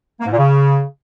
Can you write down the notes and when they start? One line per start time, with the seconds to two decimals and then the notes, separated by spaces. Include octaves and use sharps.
0.20 A#3
0.26 G#2
0.32 A#2
0.38 C#3